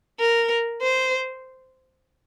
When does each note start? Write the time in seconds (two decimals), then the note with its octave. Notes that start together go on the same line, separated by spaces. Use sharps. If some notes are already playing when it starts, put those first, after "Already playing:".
0.20 A#4
0.82 C5